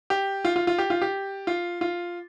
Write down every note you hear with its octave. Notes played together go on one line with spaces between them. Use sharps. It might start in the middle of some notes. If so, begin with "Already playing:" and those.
G4
F4
F4
F4
G4
F4
G4
F4
F4